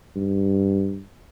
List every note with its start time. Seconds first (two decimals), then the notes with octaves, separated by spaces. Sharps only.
0.16 G2